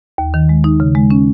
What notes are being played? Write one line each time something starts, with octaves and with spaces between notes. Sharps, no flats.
D#2
D#3
G#3
D#4
C#3
G#3
C#4